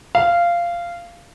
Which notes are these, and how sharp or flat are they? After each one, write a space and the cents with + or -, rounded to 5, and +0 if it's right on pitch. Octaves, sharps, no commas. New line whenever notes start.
F5 -15